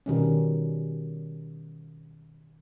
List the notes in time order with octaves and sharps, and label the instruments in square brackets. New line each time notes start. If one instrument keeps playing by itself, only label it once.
[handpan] B2 D#3 G3 C#4